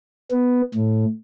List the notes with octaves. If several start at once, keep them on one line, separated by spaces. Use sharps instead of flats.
B3
A2